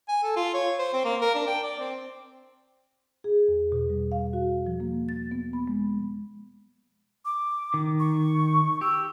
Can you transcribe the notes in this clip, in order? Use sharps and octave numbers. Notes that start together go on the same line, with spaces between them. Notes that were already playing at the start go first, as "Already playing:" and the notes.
G#5
A4
F4
C#5
C5
C4
A#3
A#4
D4
G5
D5
C4
G#4
E2
B2
G3
F5
F#4
F3
A#3
A6
B3
B5
G#3
D6
D#3
C#6
G4 E6